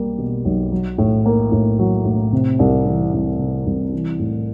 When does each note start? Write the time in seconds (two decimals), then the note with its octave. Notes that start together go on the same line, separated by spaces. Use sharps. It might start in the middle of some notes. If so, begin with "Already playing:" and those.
Already playing: B1 G3 A#3
0.18 B2
0.45 B1
0.72 F#3
0.98 A2
1.26 A#3
1.52 A2
1.79 F#3
2.05 A2
2.33 C3
2.59 C2
2.86 E3
3.13 C2
3.39 C3
3.66 C2
3.93 E3
4.19 A2